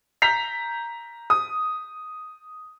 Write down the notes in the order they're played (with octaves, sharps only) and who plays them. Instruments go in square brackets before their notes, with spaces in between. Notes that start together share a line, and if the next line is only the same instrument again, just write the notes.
[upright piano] A#5 G6 B6 F7
D#6